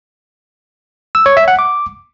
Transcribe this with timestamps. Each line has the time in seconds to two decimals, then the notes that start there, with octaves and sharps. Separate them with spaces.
1.15 E6
1.26 C#5
1.37 E5
1.48 F#5
1.59 D6